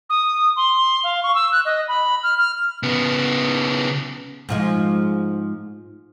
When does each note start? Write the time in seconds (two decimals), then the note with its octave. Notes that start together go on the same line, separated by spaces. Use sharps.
0.10 D#6
0.56 C6
1.04 F5
1.23 C#6
1.35 E6
1.52 F#6
1.65 D#5
1.88 B5
2.23 F6
2.38 F6
2.83 C#3 B3
4.49 G#2 F3 G#3